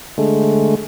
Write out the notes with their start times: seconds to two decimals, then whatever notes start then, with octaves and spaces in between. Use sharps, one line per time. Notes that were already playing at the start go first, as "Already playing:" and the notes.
0.18 D3 G#3 A3